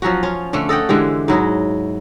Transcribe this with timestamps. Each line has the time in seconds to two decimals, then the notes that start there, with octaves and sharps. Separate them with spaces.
0.02 F3 F#3 C#4 F#4
0.23 C#4 F4
0.53 D3 A3 C#4 D4
0.69 A4 D#5 F#5 G5
0.89 D3 E3 G#3 G4
1.28 G#2 F#3 E4 D#5